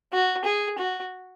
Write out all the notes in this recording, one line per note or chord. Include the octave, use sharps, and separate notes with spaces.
F#4
G#4
F#4